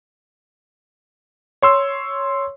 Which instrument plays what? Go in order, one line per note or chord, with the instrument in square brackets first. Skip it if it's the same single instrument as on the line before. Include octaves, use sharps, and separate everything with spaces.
[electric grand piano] C#5 C6 E6